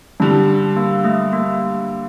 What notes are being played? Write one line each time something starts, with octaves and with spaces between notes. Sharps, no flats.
G2 D3 G3 D4
A#3
A3
A#3